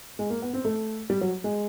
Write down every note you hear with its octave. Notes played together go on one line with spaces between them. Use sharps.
G#3
A#3
B3
C4
A3
G3
F#3
G#3